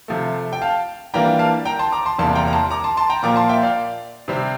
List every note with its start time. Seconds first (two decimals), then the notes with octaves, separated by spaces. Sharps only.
0.08 C3 F3 A3
0.53 G5
0.62 F5 A5
1.14 E3 G3 A#3 D4 F4 G5 A#5
1.39 F5 A5
1.65 G5 A#5
1.79 A5 C6
1.92 A#5 D6
2.05 A5 C6
2.18 E2 C3 G3 A#3 A5 C6
2.35 G5 A#5
2.48 A#5
2.53 A5 C6
2.71 A#5 D6
2.84 A5 C6
2.97 A5 C6
3.10 G5 A#5
3.23 A#2 F3 A#3 A#5 D6
3.36 A5 C6
3.49 E5 G5
3.62 D5 F5
4.28 C3 G3 C4